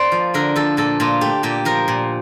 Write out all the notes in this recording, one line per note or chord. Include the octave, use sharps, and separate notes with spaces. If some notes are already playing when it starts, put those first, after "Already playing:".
Already playing: A#3 C5 D5
F3
D3 A#4
F3 A4
A#2 A4
A#2 F4
A3 G4
A#2 G4
F3 A#4
A#2